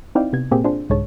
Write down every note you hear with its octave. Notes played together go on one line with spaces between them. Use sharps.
C4 D#4 E4 D5 F5 G5
C3 B3 G#6
A#2 A#3 C4 G4 G#4
D4 F4 G#4 C5
C2 G#2 D3 G#3 C#5 A5